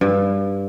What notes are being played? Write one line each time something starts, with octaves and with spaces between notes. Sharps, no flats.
G2